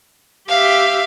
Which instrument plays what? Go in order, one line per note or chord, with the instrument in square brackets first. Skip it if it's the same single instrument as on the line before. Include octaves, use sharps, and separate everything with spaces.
[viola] G4 E5 [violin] F5